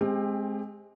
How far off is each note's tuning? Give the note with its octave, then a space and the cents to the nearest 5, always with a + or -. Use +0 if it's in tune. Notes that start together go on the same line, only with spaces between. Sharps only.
G#3 +15 C4 +10 G4 +35